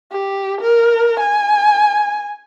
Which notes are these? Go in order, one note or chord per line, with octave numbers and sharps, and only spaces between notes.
G4
A#4
G#5